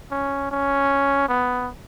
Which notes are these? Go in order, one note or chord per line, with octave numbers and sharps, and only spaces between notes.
C#4
C#4
B3